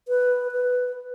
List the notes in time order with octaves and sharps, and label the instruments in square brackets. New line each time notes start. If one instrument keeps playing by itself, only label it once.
[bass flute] B4
B4